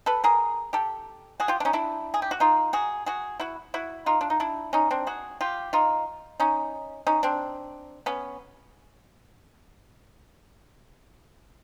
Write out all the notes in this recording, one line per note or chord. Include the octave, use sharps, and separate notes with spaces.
A4 B4
G#4 A#4
G4 A4
F#4 G#4
F4 G4
D4
C#4 D#4
D4 E4
G#4
G4
F#4
D#4 F4
F#4 G#4
F#4 G#4
E4 F#4
E4 F#4
D#4 F4
D4
D#4
D4 E4
C#4 D#4
C4 D4
F#4 G#4
F4 G4
D#4 F4
C#4 D#4
C#4 D#4
C4 D4
B3 C#4